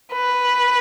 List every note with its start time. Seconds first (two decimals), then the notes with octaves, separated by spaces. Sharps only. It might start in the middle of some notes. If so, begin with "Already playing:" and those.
0.12 B4